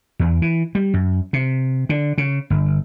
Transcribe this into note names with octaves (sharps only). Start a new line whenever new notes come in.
E2
E3
G3
F#2
C3
D3
C#3
G1